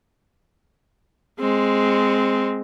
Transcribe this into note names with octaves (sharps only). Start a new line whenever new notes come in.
G#3 C4